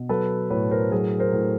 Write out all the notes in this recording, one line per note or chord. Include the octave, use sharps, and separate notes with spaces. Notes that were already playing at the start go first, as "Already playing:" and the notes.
Already playing: B2
F#3 A4 B4
A2 B4 C#5
A#4 C5
F#3 G#4 A#4
A#4 C5
A2